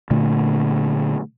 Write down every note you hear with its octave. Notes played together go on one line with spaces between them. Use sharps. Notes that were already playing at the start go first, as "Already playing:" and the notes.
A#2 D3 A3